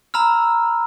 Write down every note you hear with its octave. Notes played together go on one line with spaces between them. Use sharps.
A#5 B5 E6 F6